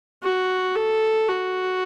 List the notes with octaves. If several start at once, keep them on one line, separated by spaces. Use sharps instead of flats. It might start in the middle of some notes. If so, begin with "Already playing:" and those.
F#4
A4
F#4